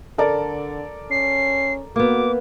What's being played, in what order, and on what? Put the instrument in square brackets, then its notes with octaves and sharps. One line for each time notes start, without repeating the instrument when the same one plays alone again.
[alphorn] D3 [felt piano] A4 A#4 D5
[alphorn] C#4 [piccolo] C7
[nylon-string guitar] A#3 B3 [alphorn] F#4 [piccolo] D6